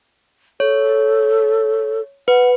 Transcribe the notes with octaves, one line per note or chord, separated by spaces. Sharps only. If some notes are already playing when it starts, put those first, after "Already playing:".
A4 C#5
B4 F#5